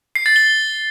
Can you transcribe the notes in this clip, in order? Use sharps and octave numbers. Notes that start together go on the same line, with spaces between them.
C7
A6
G7